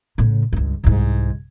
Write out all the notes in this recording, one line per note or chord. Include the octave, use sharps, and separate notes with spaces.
A2 C#3
C#2 G2
C2 G#2